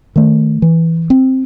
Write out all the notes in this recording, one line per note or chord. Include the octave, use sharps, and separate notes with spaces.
D#3 A3
E3
C4